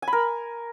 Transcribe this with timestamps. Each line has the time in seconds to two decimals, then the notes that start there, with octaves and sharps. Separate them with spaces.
0.02 G#5
0.07 B5
0.13 A#4